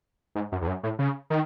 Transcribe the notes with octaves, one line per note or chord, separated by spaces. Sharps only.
G#2
F#2
E2
F#2
A2
C#3
D#3